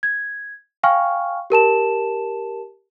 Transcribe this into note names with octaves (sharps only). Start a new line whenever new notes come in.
G#6
F5 G5 G#5 C#6 F6
G4 A#4 A5 E7